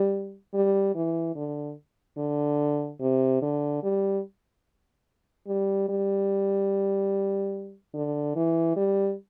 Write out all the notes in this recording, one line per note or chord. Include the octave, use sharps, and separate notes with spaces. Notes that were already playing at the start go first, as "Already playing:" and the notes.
Already playing: G3
G3
E3
D3
D3
C3
D3
G3
G3
G3
D3
E3
G3